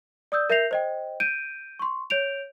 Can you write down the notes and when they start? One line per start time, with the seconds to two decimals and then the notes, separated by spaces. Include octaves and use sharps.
0.32 D5 D#6 E6 G6
0.50 A#4 E5 G6 A#6 C7 F7
0.71 C5 D#5 G5
1.20 G6 D7 D#7
1.79 C6 C#6
2.10 C#5 G6 D7 F7